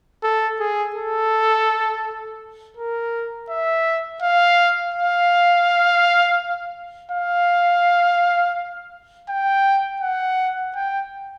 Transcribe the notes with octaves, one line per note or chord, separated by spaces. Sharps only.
A4
G#4
A4
A#4
E5
F5
F5
F5
G5
F#5
G5